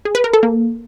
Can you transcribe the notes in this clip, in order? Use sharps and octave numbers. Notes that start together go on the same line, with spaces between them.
G#4
B4
A#4
A4
A#3